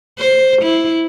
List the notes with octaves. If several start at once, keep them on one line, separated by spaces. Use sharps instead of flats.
C5
E4